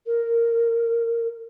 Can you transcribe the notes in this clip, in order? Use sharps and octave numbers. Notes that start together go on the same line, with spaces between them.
A#4